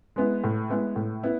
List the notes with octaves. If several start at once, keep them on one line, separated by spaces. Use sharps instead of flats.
G#3 B3 E4
A2
G#3 B3 E4
A2
B3 E4